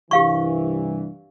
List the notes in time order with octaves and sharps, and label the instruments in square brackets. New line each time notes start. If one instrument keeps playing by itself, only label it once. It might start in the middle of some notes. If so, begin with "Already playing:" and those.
[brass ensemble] C2 G2 E3 [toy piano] G4 F5 C#6